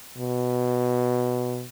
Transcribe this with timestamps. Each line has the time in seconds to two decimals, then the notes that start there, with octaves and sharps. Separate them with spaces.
0.17 B2